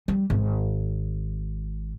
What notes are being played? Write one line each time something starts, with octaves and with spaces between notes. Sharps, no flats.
G3
G#1